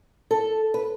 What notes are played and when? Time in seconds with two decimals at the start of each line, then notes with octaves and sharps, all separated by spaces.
0.31 A4
0.74 B4